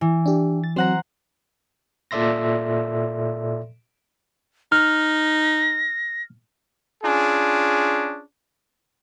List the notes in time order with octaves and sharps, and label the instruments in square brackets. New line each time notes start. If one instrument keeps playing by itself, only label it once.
[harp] E3
[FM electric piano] D4 G4
A6
[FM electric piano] F#3 C4 [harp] C5 F#5 A#5
[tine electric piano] A#2 A4 D5 E5 C6 A#6
[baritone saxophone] D#4 [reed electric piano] F6 [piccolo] A#6
[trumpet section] C#4 D4 F4 G#4